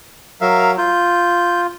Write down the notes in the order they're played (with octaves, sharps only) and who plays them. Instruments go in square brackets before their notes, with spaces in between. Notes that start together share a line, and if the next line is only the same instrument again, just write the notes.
[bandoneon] F#3 [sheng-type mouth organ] A#4 E5 F5
[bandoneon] F4 [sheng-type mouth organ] G6